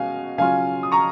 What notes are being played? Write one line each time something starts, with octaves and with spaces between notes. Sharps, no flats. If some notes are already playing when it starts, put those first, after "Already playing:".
Already playing: B2 G#3 C#4 F5 G#5
C#3 F#3 C#4 F4 F5 G#5
D#6
A#5 C#6